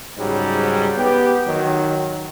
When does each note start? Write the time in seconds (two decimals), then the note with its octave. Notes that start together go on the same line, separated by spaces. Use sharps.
0.18 G#2 C#3 F#3 G3
0.96 B3 G4
1.47 D#3 F#3